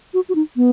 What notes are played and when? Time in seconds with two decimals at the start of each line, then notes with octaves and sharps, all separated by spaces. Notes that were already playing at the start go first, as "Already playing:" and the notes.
0.14 F#4
0.29 F#4
0.35 D#4
0.56 B3